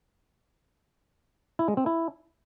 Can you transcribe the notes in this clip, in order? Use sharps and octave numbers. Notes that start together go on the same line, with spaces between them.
E4
G#3
C4
E4